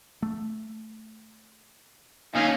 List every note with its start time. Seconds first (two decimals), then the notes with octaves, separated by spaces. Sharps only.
0.22 A3
2.35 D#2 C#4 D#4 F5 G#5